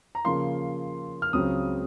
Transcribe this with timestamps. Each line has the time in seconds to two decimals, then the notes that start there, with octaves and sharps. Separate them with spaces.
0.15 A#5
0.25 C#3 F3 A#3 F4 C6
1.22 F6
1.33 C#2 C#3 F#3 C4 D#6